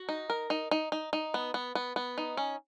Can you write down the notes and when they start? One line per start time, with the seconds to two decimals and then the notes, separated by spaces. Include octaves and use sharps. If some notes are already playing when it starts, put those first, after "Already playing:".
Already playing: F#4
0.09 D#4
0.30 A#4
0.50 D#4
0.71 D#4
0.92 D#4
1.13 D#4
1.34 B3
1.54 B3
1.75 B3
1.96 B3
2.18 D#4
2.37 C#4